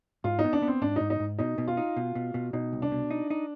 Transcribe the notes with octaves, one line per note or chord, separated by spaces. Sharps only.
G#2 F4
D#4
B3
D4
B3
C4
G#2 D4
G#2 D#4
D#4
G#2
B2 D#4
B2
F4
D#4
B2
B2
B2
B2 D#4
C2
D4
B2
D#4
D#4